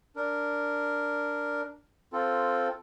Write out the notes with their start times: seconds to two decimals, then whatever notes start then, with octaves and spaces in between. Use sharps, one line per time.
0.16 D4 A#4
2.13 C4 F4 A4